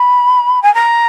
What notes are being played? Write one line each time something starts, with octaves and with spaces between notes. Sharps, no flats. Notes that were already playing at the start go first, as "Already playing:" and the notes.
Already playing: B5
G#5
A#5